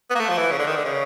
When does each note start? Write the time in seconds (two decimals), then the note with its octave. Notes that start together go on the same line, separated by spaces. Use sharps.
0.11 B3
0.15 A#3
0.20 A3
0.29 F3
0.38 E3
0.51 C#3
0.59 D3
0.67 D#3
0.76 D3
0.85 C#3